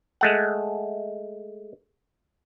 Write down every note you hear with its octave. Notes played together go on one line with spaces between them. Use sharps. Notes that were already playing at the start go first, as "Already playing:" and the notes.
G#3 A3 F#5